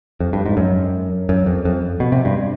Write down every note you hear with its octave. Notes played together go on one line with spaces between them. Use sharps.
F2
G2
G#2
F#2
F#2
F2
F2
B2
C3
G2